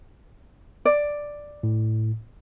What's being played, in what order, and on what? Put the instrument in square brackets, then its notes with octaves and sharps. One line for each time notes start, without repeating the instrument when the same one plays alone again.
[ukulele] D5
[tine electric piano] A2